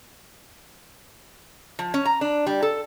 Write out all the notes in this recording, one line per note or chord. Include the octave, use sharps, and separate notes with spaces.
F3
C#4
A#5
D4
G3
A4